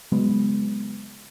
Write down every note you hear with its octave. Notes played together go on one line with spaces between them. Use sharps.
C#3 F#3 G#3 B3